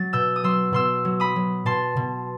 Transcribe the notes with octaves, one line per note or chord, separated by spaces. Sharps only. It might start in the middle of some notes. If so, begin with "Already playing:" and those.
Already playing: F#3 A6
B2 E6 G6
D#6
F#3 C6 E6
B2 C6 E6
F#3
B5 D#6
F#3
B2 A5 C6
B2